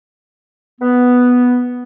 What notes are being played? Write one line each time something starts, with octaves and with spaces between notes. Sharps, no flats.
B3